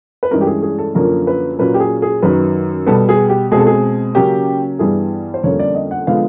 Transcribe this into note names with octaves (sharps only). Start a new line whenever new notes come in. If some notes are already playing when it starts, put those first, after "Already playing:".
B4
G2 E3 G#3 C#4 A#4
G4
G#4
G#4
A4
F#2 D3 F3 A#3 C#4 A#4
B4
A#2 F#3 A#3 C#4 B4
G4
G#4
G#4
F#2 D#3 F#3 B4
B2 G3 B3 A4
G#4
G4
B2 G#3 C4 G#4
A4
G#4
C#3 F#3 A#3 C#4 G4
G2 E3 G3 B3 G#4
C5
F2 D3 G3 A#3 C#4 C#5
D5
D#5
F#5
D3 F3 G#3 B3 F5